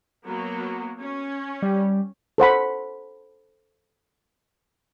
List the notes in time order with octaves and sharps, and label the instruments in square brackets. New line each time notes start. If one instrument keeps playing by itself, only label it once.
[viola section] F#3 A#3 B3
C#4
[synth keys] G3
[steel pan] A4 C5 F#5 B5